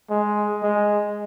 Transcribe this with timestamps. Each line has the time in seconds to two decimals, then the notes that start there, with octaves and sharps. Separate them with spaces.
0.10 G#3
0.63 G#3